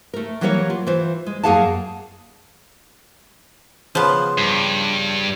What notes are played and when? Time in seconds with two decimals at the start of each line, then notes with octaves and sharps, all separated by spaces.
0.14 A3 A#4
0.41 E3 F#3 G3 A#3 A#4 C#5
0.70 F4
0.87 E3 F4 C5
1.26 G#3
1.43 F#2 A#3 G#4 F5 F#5 A5
3.95 C#3 F3 B3 D#4 C6
4.38 G2